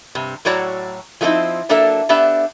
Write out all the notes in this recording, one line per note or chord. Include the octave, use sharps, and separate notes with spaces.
G2 C3
A2 F#3 F#4 C#5 D5 A#5
F3 F#3 A3 C4 D#4 E4
F#3 A#3 D4 A4 A#4 E5
B3 D4 G4 E5